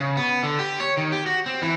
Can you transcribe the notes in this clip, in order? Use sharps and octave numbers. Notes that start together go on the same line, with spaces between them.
C#3
B3
D3
G4
C#5
D#3
G4
F#4
C4
E3